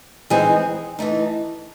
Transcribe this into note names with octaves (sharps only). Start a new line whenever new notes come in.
E3 G#3 C4 D#4 G#4
E3 A3 D#4